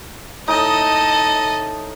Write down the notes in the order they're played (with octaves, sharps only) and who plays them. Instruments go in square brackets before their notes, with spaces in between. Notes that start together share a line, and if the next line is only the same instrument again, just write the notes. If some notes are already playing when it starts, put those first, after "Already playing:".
[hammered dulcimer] A2 D#4 [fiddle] A4 D#5